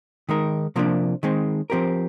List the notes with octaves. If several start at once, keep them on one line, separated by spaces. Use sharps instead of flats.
D#3 G#3 D#4 A#4
C3 F3 A#3 D4
D#3 G#3 C4
F3 C4 G4 A#4